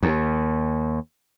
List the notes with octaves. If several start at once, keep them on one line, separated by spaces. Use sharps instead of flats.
D#2